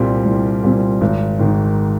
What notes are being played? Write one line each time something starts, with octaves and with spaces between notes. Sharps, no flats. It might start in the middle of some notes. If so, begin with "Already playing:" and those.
Already playing: C2 A#2 G3 C4
C2
A#2 G3 C4
G#1
G#2 D#3